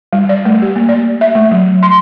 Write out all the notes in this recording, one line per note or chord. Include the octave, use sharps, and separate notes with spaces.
G3
D5
A3
G4
A#3
D5
E5
A3
F#3
C6